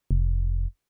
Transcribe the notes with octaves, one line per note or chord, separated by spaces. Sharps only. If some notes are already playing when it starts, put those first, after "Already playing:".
F1